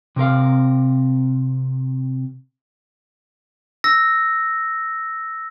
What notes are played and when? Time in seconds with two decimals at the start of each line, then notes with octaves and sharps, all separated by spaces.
0.16 C3 C4 A#4 F5
3.84 E6 A#6